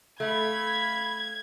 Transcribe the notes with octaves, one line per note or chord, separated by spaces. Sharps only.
A3 F5 B5 G#6